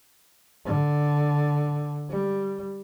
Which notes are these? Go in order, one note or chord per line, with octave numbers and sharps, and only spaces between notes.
D3
G3